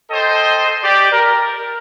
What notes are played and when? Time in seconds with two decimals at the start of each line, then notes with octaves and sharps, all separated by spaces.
0.10 A4 C5 D#5 G5
0.83 G4 D5
1.12 A#4